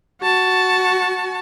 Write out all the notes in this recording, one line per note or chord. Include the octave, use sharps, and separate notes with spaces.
F#4 A5